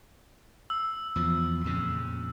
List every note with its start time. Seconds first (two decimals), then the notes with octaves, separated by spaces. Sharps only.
0.70 E6
1.16 E2 F3
1.64 F2 A#2 C#3